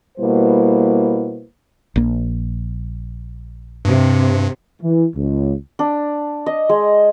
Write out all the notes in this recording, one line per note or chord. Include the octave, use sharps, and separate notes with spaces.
B2 G3 A#3 E4 B4 C5
A#1 A#3
G2 C3
E3
C#2
D4
D#5
G#3